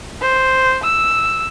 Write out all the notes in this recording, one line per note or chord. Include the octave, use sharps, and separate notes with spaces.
C5
E6